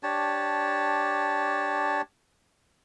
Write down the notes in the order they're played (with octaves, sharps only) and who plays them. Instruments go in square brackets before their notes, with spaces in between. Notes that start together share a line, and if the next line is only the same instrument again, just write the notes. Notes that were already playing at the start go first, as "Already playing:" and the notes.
[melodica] D4 G4 C#5 A5